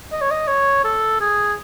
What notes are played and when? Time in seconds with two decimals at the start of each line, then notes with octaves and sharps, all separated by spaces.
0.12 D#5
0.21 C#5
0.31 D#5
0.47 C#5
0.84 A4
1.21 G#4